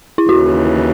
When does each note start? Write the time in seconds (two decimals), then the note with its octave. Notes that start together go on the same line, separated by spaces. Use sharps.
0.18 E4
0.29 D#2 C#3 E3 F#4